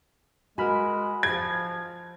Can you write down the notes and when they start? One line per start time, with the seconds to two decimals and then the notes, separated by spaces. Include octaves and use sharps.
0.58 G#3 F#4 A#4 G#5 B5 F6
1.23 F3 G#6